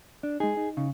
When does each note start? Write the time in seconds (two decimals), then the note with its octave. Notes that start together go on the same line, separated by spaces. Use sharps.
0.23 D4
0.40 G#3 D#4 G#4
0.57 D#4
0.77 C#3